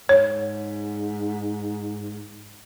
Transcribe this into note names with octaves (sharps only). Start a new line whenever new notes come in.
G#2 C#5